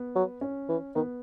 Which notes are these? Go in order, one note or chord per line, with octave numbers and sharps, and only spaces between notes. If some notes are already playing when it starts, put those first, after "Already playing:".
Already playing: B3
F#3
C#4
E3
D#3 B3